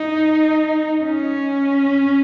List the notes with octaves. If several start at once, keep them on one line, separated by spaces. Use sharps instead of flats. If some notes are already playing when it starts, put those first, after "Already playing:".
Already playing: D#4
C#4